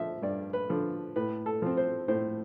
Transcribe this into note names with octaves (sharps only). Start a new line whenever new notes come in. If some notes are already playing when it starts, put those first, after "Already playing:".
Already playing: D3 F3 E5
G2 D5
B4
D3 F3
A2 B4
A4
F3 C4
C5
A2 C5